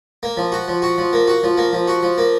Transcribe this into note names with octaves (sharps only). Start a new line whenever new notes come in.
A#3
F3
F#4
F3
F#4
F3
A#3
F#4
F3
A#3
F3
F#4
F3
A#3